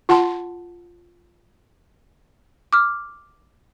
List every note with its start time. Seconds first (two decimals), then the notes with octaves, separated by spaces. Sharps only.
0.09 F4 F#5 A5 C6
2.73 D6 F6